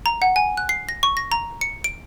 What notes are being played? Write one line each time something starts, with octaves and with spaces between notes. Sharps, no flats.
A#5
F#5
G#5
F#6
C7
A#6
C#6
A#6
A#5
C#7
D7